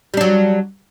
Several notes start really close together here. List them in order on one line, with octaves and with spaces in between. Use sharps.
G3 D4 F#3